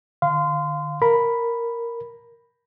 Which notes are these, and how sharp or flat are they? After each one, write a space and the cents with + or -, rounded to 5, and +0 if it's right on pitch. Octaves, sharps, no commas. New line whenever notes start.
D3 +45 F5 +0 C6 -25
A#4 +0 B5 +0